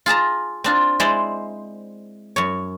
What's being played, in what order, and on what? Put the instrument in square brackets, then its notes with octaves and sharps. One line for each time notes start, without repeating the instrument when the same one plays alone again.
[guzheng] F4 G#4 A5 A#5
C4 D4 F4
G#3 E4 C5 D5 D#5
F#2 C#5